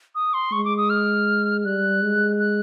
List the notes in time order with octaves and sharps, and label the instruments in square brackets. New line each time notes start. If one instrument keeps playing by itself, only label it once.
[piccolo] D#6
C6
[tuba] G#3 [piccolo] C#6
[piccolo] D6
D#6
F6
[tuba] G3 [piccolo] F#6
[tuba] G#3
[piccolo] F#6